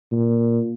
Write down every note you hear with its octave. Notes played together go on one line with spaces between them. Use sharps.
A#2